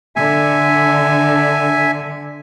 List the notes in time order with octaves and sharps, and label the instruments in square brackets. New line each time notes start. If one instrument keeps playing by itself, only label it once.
[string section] D3 [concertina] E5 G#5